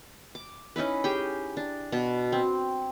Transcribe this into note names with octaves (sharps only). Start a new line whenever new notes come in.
D6
C#4 D#4 E4 B4
G4 G#4 G5
D4
B2 F#4
C4